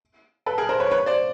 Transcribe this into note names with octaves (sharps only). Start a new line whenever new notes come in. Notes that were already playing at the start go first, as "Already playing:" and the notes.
A4 B4
G#4 A#4
A#4 C5
B4 C#5
B4 C#5
C5 D5